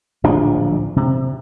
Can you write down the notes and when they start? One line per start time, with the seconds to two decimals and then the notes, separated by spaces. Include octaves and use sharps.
0.24 D1 A#1 F3 D4
0.96 C3